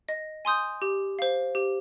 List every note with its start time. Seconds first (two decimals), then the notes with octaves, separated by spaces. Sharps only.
0.09 D#5
0.45 G#5 C6 D#6 G6
0.82 G4
1.19 C5 F5
1.55 G4